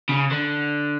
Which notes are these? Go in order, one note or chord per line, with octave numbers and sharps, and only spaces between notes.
C#3
D3